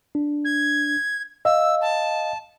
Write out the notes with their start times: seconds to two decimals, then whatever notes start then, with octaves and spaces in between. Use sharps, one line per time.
0.15 D4
0.45 G#6
1.45 D#5 F5 E6
1.81 A5